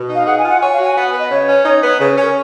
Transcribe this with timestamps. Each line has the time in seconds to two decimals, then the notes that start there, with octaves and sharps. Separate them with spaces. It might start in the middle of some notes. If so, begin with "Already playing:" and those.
Already playing: B2
0.09 D#4
0.15 F5
0.27 G#4 F#5
0.38 G#5
0.44 F4
0.50 F#5
0.61 C#5 G#5
0.73 F5
0.78 F#4
0.84 G#5
0.96 B3 F#5
1.13 B4
1.19 D#5
1.30 C#3 C#5
1.48 C#4
1.65 D#4
1.82 B3
2.00 C#3 B4
2.11 C#5
2.17 C#4
2.23 A#4